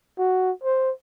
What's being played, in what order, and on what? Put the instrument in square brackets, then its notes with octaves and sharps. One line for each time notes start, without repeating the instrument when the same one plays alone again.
[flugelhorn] F#4
C5